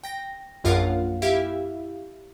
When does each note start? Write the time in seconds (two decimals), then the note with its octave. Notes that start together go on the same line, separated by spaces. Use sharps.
0.04 G5 A#6
0.64 A#1 F#2 F4 A#4 F5 F#5
1.22 E4 G4 E5 F5